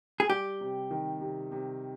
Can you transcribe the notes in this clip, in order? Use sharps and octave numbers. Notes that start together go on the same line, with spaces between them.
G#4
G3 G4
C3
D#3
C3
C3